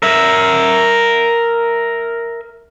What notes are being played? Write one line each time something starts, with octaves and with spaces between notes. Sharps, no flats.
A#4 E5